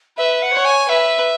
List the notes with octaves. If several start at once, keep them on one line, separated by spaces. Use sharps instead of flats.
B4 E5
F#5
C#5
G#5
B4 E5